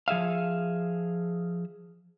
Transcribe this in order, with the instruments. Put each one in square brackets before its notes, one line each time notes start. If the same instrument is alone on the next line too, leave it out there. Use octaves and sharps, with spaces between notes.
[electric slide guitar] F3 G#4 E5 F5